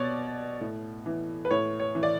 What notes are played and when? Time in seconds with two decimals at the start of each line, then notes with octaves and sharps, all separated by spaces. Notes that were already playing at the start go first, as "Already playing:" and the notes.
Already playing: B2 C#5 D5
0.61 A2
1.06 E3
1.45 B4
1.51 A2 C#5
1.80 C#5
1.95 E3
2.03 D5